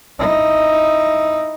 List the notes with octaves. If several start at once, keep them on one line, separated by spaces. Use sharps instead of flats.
D#4 E4